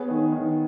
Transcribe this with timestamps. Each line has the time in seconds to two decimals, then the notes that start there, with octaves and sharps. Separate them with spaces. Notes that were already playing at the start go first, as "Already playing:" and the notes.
Already playing: B3 G#4 C#5
0.09 D#3
0.32 D#3